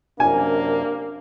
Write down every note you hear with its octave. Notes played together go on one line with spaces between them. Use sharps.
F#2 C3 A#3 D4 G#5